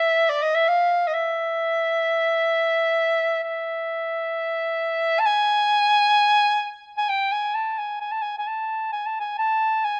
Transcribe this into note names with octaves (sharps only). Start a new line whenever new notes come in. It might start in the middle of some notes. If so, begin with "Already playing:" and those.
Already playing: E5
D5
D#5
E5
F5
D#5
E5
E5
A5
G#5
G#5
G5
G#5
A5
G#5
G#5
A5
G#5
G#5
A5
G#5
A5
G#5
A5
G#5